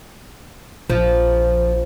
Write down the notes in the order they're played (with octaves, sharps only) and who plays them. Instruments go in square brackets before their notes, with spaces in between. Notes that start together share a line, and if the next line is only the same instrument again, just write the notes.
[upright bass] A#1 [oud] F3